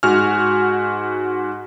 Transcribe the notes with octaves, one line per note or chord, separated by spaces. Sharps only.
G#2 F#4 G#5 F6